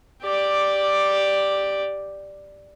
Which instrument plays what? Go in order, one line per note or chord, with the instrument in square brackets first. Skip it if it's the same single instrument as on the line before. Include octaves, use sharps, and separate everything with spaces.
[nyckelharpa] G4 D5